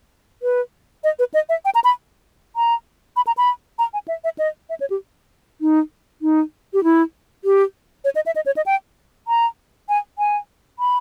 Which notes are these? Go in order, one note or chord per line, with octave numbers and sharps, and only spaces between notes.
B4
D#5
B4
D#5
E5
G5
A#5
B5
A#5
B5
A#5
B5
A#5
G#5
E5
E5
D#5
E5
C#5
G4
D#4
D#4
G4
E4
G4
C#5
D#5
E5
D#5
C#5
D#5
G5
A#5
G#5
G#5
B5